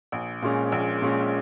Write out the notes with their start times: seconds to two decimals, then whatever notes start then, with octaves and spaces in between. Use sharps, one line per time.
0.12 A#1
0.42 A#2 G#3 C#4
0.72 A#1
1.02 A#2 G#3 C#4